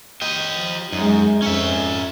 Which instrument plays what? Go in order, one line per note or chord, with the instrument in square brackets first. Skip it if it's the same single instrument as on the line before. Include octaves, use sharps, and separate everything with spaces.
[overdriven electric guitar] G4 D#5
[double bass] F3
[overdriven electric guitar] F#2 [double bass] G#3 D#4
[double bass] F2 [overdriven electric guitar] C#4 E5